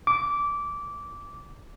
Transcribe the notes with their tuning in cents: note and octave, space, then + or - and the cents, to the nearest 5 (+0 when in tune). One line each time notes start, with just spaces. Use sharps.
D6 -15